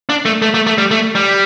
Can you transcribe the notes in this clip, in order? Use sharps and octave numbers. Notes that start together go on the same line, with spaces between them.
D4
A3
A3
A3
A3
G3
A3
G3